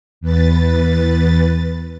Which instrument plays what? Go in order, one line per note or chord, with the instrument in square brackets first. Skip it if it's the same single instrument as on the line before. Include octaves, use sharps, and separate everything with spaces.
[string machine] E2 B4 A6